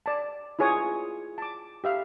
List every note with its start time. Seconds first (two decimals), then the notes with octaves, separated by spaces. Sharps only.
0.06 D5 A5
0.59 E4 F4 G#4 C#5 G#5 D#6
1.38 A5 D6
1.84 G4 E5 F5